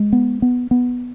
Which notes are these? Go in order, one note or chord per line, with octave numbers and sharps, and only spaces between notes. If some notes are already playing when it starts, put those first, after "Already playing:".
Already playing: G#3
B3
B3
B3